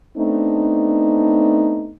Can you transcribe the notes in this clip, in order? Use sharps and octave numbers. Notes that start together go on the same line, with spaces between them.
A3 B3 C4 D4 D#4